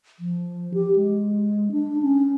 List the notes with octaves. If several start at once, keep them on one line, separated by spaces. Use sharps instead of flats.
F3
G4
G#3
D4
C#4